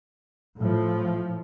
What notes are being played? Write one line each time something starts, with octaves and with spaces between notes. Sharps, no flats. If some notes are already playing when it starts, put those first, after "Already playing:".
A2 F3